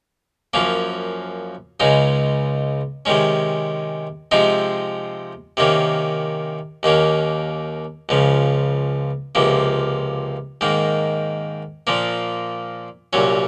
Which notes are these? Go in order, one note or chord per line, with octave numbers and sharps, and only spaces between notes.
F#2 F3 A#3 C#4
C#2 C#3 G#3 D#4
C3 D#3 G#3 C#4
C3 F3 G#3 C4 D#4
C3 D#3 A#3 C#4
D#2 D#3 A#3 C#4
C#2 C#3 F3
C#2 C3 F3 A#3
G#2 D#3 A#3
A#2 F3 A#3
C2 A#2 F#3 C#4